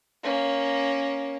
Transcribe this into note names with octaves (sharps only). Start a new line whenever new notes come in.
A#3 C#4